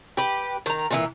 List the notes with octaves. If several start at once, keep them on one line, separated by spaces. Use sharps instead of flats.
G4 B4
D#3 A#5
A#2 D#3 E3